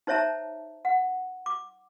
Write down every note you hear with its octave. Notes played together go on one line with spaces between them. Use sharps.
D#4 C5 C#5 E5 A5 A#5
F#5
D6